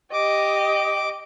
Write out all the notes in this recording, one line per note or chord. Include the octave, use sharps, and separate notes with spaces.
G4 D#5 D6